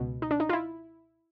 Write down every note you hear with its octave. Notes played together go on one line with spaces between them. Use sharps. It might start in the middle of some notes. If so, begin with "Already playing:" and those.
Already playing: C#2 B2
D#4
D4
D#4
F4
E4